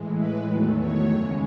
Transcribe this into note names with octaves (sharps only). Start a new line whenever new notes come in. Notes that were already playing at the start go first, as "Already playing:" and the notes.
Already playing: A2 E3 G#3
B4
E2 D#3 F#3 A3
C#5
F#2 C#3 G#3